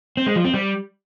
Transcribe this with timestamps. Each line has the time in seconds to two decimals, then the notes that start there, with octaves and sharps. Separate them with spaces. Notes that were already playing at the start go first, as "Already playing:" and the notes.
0.17 C4
0.26 G#3
0.36 F3
0.45 C4
0.54 G3